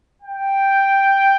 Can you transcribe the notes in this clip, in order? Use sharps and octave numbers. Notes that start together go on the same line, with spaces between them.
G5